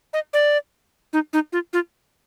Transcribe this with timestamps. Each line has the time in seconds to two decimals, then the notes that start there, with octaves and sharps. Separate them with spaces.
0.13 D#5
0.33 D5
1.13 D#4
1.33 D#4
1.52 F4
1.73 F4